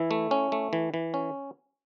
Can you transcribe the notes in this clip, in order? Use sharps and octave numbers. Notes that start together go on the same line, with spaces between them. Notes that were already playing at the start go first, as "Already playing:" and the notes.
Already playing: E3 E4
A3
C#4
A3
E3
E3
C#4